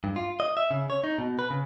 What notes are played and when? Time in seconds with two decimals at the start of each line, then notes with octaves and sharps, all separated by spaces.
0.04 G2
0.16 F4
0.40 D#5
0.57 E5
0.71 C#3
0.90 C#5
1.04 D#4
1.18 B2
1.39 B4
1.50 C#3